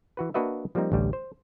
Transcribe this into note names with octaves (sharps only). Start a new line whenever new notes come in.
E3 F#4 B4
A#3 D4 F#4 B4 D#5 E5
F3 G3 A#3 C4 D#4
A1 D2 G3
C5